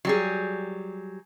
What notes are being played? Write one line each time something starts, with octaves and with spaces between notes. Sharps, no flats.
F#3 G3 G#4